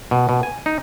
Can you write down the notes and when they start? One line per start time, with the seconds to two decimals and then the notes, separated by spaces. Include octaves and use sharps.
0.11 B2
0.29 B2
0.43 G#5
0.66 D#4